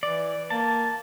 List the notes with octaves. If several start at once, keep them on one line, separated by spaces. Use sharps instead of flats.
E3 D5
A#3 A5